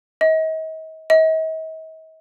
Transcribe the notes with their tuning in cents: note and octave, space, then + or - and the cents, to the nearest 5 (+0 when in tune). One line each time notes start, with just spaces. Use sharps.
D#5 +40
D#5 +45